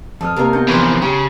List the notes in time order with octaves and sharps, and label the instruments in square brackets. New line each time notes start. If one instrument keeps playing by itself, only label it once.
[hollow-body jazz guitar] F2 [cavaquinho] A4 [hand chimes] A5 D#6 F6
[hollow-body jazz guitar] C3 A#3 [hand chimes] G4 D#5 [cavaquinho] A#4 E5
[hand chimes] B3 D4 G6 [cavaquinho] F#4
[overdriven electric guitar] E3 F3 [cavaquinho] C#5 C6 [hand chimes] G#5 A#5
[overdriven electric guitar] C#3 [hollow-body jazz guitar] G4